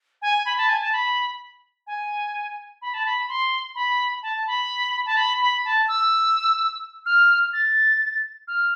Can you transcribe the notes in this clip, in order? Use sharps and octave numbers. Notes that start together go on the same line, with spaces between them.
G#5
B5
A5
G#5
A5
B5
G#5
B5
A5
B5
C6
B5
A5
B5
A5
B5
B5
A5
E6
F6
A6
F6